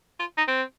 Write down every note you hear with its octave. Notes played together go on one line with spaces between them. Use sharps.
F4
D#4
C4